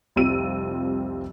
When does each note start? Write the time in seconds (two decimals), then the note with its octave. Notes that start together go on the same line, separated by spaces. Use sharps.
0.16 F1 C2 C4 F4 E6 D#7